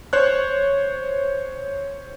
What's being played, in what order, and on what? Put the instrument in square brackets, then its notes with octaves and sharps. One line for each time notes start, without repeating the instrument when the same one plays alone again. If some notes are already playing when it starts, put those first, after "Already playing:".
[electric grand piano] C5 C#5 F#6